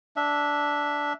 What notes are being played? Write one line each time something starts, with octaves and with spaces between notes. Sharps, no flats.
D4 E5